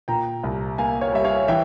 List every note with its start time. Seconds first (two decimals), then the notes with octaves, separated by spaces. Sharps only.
0.08 A#2 G5 A#5
0.43 C2
0.78 A#3 F5 G#5
1.01 C#5 F5
1.12 G3 E5
1.24 C#5 F5
1.48 E3 E5 G5